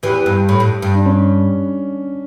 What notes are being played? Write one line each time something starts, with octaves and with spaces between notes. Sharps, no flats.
E2 E3 G4
G2
A2
G2
G2
D4
C#4